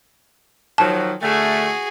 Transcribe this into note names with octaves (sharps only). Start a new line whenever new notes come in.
D#3 F3 F#3 A5
D3 A3 F#4 G#4